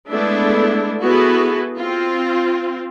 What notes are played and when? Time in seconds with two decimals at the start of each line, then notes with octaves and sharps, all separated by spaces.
0.10 G#3 A3 B3 D4 E4 A4
1.02 B3 E4 F#4 G#4 A4 B4
1.77 C4 F4